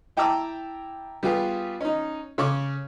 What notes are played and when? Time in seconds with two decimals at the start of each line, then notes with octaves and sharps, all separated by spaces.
0.17 E4 G5 A5 A#5 D6 E6
1.23 G3 B3 F4 G4 G#4
1.81 C#4 D#4
2.38 C#3 C#4 C#6 D6